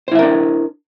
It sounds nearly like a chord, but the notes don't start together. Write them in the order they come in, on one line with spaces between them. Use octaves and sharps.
C5 E4 E5 A#4 D4